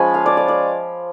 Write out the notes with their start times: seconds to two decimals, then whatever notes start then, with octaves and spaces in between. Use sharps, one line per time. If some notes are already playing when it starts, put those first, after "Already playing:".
Already playing: F3 G#3 C#4 F4 G#5 B5
0.14 F5
0.26 D5
0.37 D5
0.48 D5